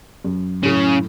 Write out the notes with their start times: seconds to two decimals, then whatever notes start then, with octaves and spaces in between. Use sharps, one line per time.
0.24 F#2
0.63 F#2 A2 C#3